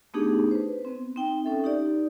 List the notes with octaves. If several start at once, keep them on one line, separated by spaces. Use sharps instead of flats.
A3 B3 D4 D#4 G4 G#4
B4 C5
B3 C4
C4 D#4 G5
C#4 A4 E5
D#4 G4 D5